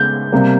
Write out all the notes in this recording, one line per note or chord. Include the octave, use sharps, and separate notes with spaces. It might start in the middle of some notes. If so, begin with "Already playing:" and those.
Already playing: C#3 G#3 G6
C3 G3 A#3